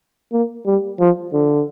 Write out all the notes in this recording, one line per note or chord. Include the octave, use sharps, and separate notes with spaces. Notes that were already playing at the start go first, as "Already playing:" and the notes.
A#3
G3
F3
D3